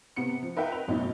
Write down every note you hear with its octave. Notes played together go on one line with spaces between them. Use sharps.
C3 B3 C#7
F3
D#4 A#4 B4 E5 F#5 G5
B4 F7
A1 F#2 B2 D#4